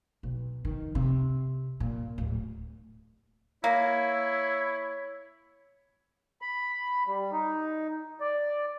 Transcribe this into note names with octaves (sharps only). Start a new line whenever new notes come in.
B1
D#3
C3
A#2
D1
A#3 E4 C#5
B5
G3
D#4
D5